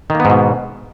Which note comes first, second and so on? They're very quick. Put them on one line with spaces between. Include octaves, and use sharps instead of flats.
D#3 A#3 B3 G#2 B2